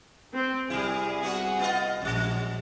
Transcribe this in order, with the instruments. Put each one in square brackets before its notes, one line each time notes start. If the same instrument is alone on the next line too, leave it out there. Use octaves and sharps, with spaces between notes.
[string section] C4
[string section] C2 G#4 [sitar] G3 E4
[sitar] B3 F#4
B3 F4 D#5
[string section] A#1 [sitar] F#2 G3